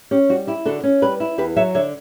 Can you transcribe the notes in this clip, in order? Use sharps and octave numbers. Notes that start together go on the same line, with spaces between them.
C#4 G4
G3 F#4
E4 G4
D3 F#4 A4
C#4
G3 G4 B4
E4
E2 G4 B4
F#3 C#5 E5
D3 C#5 E5